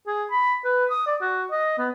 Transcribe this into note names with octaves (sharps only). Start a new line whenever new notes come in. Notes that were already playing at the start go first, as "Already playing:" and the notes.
G#4
B5
B4
D#6
D5
F#4
D#5
B3